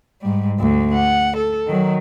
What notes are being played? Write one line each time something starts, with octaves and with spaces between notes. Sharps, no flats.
G#2 G3
D2
F#5
A4
D#3 F#3